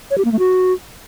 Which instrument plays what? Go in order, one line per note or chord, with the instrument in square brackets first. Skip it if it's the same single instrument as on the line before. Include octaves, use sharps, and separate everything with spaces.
[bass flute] C#5
G4
A#3
A3
F#4